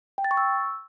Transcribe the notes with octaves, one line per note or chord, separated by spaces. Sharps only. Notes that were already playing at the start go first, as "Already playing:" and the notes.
G5
A6
C#6
E6